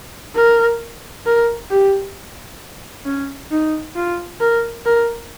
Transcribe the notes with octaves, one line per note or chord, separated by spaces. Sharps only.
A#4
A#4
G4
C#4
D#4
F4
A#4
A#4